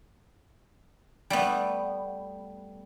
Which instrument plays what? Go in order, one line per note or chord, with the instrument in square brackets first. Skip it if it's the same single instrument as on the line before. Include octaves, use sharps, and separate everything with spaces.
[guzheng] G3 A3 B3